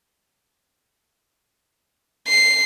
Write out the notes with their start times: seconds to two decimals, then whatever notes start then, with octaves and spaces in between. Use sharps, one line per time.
2.28 C7